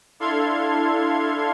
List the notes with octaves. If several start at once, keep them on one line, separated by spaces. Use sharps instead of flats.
D4 E4 A4 F5 C6 G#6